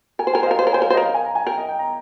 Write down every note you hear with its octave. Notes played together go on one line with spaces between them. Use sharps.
A#4 G#5
C5
A#4 G#5
C5 D#5
A#4 F5
C5
C#5
A#4
C5 G#5
A#4 F5
C5
A#4 D#5
F5
G#5
A#5
G#5
A#4 G5
D#5
G5
A#5